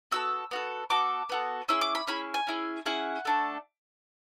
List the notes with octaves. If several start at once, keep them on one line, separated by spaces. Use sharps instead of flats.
B3 F#4 A4 E6
B3 F#4 A4
B3 F#4 A4 D6
B3 F#4 A4
C#4 E4 G#4 E6
D6
B5
C#4 E4 G#4 B5
G#5
C#4 E4 G#4
C#4 E4 G#4 F#5
A3 D4 A4